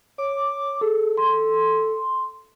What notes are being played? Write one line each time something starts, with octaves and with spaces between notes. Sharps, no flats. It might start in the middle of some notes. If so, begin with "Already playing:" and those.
C#5 D6
G#4 A4
C6